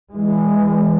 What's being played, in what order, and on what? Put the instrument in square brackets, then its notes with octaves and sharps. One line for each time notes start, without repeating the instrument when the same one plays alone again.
[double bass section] E3 G#3